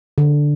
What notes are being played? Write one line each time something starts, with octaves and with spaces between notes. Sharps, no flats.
D3